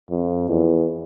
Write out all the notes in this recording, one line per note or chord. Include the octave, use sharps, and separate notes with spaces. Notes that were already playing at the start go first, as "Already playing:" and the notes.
F2
E2